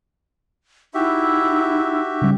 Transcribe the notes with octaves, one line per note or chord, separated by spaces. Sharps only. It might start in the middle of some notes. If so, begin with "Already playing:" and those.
D#4 E4 F#4 G4 E5
C#3 G3